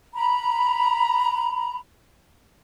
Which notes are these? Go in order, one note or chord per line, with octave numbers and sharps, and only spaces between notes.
A#5 B5